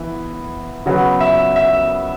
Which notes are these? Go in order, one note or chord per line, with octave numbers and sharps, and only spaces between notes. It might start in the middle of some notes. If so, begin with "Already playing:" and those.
Already playing: E3 B3 E4
C#3 F#3 B3
E5
E5